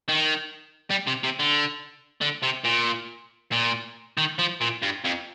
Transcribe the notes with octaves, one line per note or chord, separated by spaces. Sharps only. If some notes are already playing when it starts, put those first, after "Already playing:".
D#3
G3
C3
C3
D3
D3
C3
A#2
A#2
D#3
F3
A#2
G2
F2